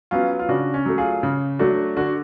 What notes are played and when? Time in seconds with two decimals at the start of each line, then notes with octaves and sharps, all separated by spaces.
0.11 F#3 B3 C#4 F4
0.39 F4
0.49 C#3 D4 F#4
0.74 C#4
0.86 F#3 A3
0.98 F4 G#4
1.23 C#3
1.59 F#3 A3 D4 F#4
1.96 D3 D4 F#4